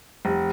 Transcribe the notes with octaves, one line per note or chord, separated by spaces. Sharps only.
F1